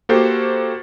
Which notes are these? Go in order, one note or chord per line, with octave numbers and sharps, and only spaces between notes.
A#3 F#4 G4 A4 C5